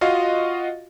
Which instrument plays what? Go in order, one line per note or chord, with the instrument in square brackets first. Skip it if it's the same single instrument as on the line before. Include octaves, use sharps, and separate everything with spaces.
[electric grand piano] F4 F#4 D#5 F5